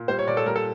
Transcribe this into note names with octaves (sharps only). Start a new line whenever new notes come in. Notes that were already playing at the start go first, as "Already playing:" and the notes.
Already playing: A#2
G3 C5
C#5
A#2 D5
A4
G3 A#4
A4